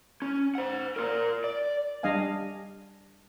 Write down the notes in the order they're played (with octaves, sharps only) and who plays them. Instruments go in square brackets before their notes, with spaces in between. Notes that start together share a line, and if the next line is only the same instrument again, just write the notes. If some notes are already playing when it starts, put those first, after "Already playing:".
[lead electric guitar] C#4
C5 F#5
F4 A#4
D5
[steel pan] G3 D4 D#5 F5 G#5